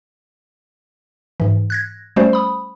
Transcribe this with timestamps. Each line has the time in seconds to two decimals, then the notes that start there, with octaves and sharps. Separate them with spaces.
1.40 G#2 E3
1.70 F#6 G#6 A#6
2.16 G3 A3 C#4 F#4 C5 D5
2.33 B5 D#6